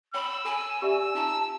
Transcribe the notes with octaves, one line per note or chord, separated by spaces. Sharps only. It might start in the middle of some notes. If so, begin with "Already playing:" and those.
C#5 G5 B5 E6
A4 G#5
G4 D5 E5 E6
D#4 F4 A5 A#5